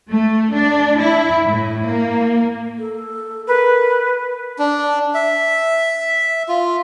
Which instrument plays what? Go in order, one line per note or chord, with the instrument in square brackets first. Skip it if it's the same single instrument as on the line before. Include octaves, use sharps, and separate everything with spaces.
[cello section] A3
D4
E4
A2
A#3
[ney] A4
[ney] A#4 [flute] B4
[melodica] D4
E5
F4